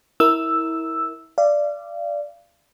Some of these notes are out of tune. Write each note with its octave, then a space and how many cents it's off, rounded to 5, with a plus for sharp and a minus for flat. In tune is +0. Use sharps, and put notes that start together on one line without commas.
E4 -20 A#4 +0 E6 +0
D5 +0 F5 -35